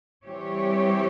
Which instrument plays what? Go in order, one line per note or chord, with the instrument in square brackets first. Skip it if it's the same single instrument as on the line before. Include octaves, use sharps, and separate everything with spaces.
[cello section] E3 G3 C4 G4 C#5